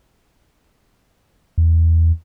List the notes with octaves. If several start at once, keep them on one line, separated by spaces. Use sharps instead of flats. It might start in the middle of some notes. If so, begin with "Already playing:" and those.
E2